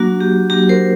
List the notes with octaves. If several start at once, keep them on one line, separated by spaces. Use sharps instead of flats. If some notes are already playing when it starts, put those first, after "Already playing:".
Already playing: F#3 A#3 D4 F#4
G4
F#3 A#3 D4 F#4 G4
A#4 C5